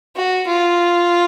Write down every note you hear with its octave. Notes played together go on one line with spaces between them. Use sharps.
F#4
F4